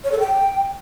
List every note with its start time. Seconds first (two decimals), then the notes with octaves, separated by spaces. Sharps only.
0.04 C#5
0.12 A4
0.20 G5